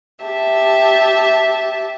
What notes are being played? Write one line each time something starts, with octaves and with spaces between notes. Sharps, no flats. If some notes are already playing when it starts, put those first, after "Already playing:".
G4 E5 A5